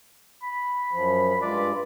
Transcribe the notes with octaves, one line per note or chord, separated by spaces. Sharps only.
B5
F#2 F3
G2 G#3 F4 D5